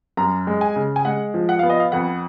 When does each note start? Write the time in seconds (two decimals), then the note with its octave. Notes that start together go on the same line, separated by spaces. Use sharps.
0.17 F#2 A#5
0.47 G#3
0.61 G#5
0.76 C#3
0.96 G#5
1.05 G#3 F#5
1.34 F3
1.49 F#5
1.59 B3 F5
1.70 D#5
1.80 F5
1.92 F2 F#5